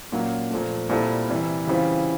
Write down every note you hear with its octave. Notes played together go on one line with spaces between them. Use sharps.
A#2 F#3 A#3 C#4
A#2 F3 A3
A#2 G3 C4 E4 A4
C3 E3 G3
C#3 E3 G3 C4 F4